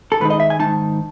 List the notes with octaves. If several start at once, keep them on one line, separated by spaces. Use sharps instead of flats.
A4
G#2 D#3 G#3 D#4 B4
D#5
E5
G#5
G#2 D#3 G#3 D#4 A5